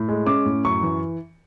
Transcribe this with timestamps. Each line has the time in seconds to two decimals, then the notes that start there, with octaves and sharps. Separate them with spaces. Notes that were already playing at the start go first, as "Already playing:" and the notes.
Already playing: A2
0.09 G#3
0.27 C#4 D6
0.45 A2
0.65 F#2 C#6
0.83 E3